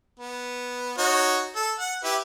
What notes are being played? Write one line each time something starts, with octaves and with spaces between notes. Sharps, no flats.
B3
D#4 F#4 C#5
A4
F#5
E4 G4 B4